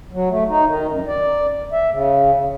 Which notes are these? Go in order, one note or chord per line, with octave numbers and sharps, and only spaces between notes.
F#3
A3
D#4
D#3
F#2
D5
E5
C#3